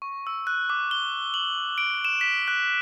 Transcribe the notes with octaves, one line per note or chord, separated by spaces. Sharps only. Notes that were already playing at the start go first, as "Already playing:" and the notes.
C#6
E6
F#6
D6
G7
F#7
D7
E7
B6
F#6